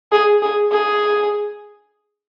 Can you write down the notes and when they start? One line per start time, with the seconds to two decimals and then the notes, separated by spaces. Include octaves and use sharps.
0.12 G#4
0.42 G#4
0.72 G#4